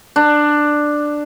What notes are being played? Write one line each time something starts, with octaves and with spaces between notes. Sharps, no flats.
D4